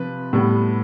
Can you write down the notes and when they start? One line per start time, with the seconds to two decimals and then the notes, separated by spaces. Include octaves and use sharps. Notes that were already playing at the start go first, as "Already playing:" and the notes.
Already playing: C3 F3 B4
0.33 A2 G3 B3